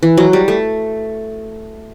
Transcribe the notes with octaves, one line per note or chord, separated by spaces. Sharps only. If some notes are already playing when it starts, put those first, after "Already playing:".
E3
F#3
G3
A3